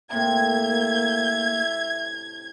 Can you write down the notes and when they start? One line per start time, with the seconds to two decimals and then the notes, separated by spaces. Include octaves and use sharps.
0.12 A2 C3 A#3 E5 G#6